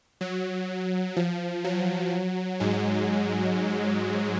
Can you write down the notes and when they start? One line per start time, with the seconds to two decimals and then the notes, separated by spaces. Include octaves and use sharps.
0.21 F#3
1.16 F3
1.64 F#3
2.60 G#2 G#3